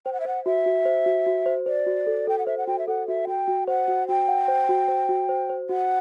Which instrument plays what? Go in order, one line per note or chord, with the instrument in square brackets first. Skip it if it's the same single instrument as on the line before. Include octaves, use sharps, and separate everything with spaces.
[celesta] C5 [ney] G5
[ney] F#5
E5
[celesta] C5 [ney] F#5
[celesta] F#4 [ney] E5
[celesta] F#4
C5
F#4
F#4
C5
[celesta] C5 [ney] D5
[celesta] F#4
A4
[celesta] A4 [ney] G5
[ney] F#5
[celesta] C5 [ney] E5
[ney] F#5
[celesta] F#4 [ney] G5
[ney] E5
[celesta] A4 [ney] F#5
[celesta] F#4 [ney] E5
[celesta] F#4 [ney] G5
[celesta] F#4
[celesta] C5 [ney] F#5
[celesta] F#4
[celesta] F#4 [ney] G5
[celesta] F#5
C5
F#4
C5
F#4
C5
C5
[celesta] F#4 [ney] F#5